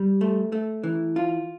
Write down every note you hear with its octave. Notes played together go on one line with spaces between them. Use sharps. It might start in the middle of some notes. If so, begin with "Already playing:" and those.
Already playing: G3
A3
A3
E3
F4